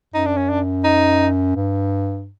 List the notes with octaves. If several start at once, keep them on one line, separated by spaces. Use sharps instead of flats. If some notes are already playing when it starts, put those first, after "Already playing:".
F#2 D#4
D4
C#4
D4
D#4
G2